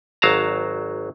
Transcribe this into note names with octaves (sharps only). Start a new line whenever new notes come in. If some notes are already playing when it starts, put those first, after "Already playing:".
G#1 F#3 F5 A5 A#5